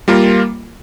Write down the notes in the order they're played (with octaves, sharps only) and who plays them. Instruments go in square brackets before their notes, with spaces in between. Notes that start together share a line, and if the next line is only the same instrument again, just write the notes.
[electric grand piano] G3 A#3 F4 A#4